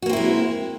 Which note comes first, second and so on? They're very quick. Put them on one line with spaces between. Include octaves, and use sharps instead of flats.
F#4 A#3 C4 E4 G#3